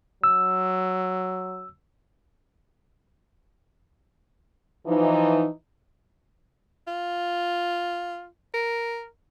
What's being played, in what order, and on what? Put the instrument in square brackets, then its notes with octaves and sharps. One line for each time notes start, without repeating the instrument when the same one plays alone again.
[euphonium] F#3 [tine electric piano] E6
[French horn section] E3 F3 D#4
[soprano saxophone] F4
A#4